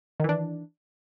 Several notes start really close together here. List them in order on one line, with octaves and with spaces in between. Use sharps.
D#3 E3 D4